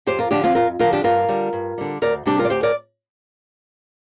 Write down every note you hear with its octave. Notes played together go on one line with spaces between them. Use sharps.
F2 G4 C5
F4 A#4
D3 F3 D4 G4
C4 F4
F2 F4 A#4
D3 F3 F4 A#4
D4 G4
G2 F4 A#4
D3 G3
G2
D3 G3
D2 A#4 D5
C3 G3 D4 G4
F4 A#4
D5
D2 G4 C5
A#4 D5